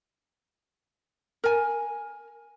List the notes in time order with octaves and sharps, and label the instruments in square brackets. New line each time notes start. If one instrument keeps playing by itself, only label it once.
[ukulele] A#4 G#5